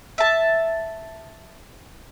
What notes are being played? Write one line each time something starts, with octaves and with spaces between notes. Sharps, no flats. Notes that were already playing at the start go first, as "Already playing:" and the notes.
E5 A5